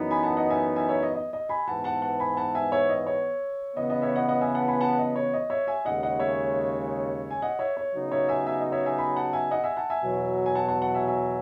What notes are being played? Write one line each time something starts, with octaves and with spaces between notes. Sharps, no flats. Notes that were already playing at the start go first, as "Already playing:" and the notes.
Already playing: F#2 E3 B3 D#4
G#5 B5
F#5 A5
D#5 F#5
E5 G#5
E5 G#5
C#5 E5
D#5
D#5
D#5
G#5 B5
G#2 E3 B3 F#5 A5
F#5 A5
F#5 A5
G#5 B5
F#5 A5
E5 G#5
C#5 E5
D#5
C#5
C#3 E3 B3 D#5
D#5
C#5 E5
D#5 F#5
D#5 F#5
E5 G#5
F#5 A5
G#5 B5
F#5 A5
D#5
C#5
D#5
C#5 E5
E5 G#5
D#2 C#3 G#3 D#5 F#5
D#5 F#5
C#5 E5
G#5
D#5 F#5
C#5 E5
C#5
C#3 F#3 B3 D#4 F#4
C#5 E5
E5 G#5
E5 G#5
D#5
C#5 E5
E5 G#5
G#5 B5
F#5 A5
E5 G#5
D#5 F#5
E5 G#5
F#5 A5
E5 G#5
E2 B2 F#3
G#5
F#5 A5
F#5 A5
F#5 A5
E5 G#5
E5 G#5